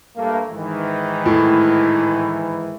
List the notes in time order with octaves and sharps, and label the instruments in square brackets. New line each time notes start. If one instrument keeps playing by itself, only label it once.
[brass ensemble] G2 A3 A#3
G#2 D#3 E3
[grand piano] A2